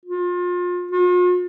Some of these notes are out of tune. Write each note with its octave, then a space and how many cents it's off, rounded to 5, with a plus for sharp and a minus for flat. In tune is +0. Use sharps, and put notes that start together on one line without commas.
F4 +30
F4 +45